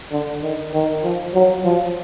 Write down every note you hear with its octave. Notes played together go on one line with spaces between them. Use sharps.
D3
D#3
D#3
F3
F#3
F3